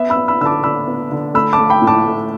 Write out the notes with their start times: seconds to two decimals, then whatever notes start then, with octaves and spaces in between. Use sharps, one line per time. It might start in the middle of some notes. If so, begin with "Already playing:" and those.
Already playing: B3 E5
0.10 B5 E6
0.17 B3
0.28 B5 E6
0.41 D3 E6
0.45 A5 D6
0.64 D3 B5 E6
0.88 B3
1.12 D3
1.34 A3 B5 E6
1.53 A5 D6
1.59 A3
1.70 G5 B5
1.82 A2
1.87 A5 D6
2.06 A3